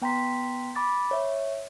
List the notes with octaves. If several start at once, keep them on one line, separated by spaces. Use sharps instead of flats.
B3 G5 A#5 C6 B6
B5 D6 A6
C#5 E5